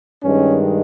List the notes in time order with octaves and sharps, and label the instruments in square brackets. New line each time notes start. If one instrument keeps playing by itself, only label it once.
[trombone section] G2 D#3 G#3 C#4